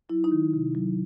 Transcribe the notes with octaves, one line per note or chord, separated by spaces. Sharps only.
F#3 E4
D#4
D#3
C3
F#3